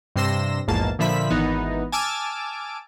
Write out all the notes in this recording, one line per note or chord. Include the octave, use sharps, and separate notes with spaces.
G2 C3 C6 E6 A#6 E7
A#1 E2 G#2 A#3 A5
A#2 D3 F3 E5 B5 B6
G#1 E3 B3 D#4
G#5 A5 D6 E6 F6